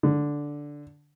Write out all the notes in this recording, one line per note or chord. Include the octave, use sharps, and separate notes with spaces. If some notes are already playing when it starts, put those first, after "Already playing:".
D3